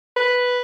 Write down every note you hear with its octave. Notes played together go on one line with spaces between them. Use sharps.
B4